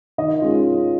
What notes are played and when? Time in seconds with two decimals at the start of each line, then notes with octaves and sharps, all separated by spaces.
0.18 D#3 D#5
0.41 G#3 C#4 F4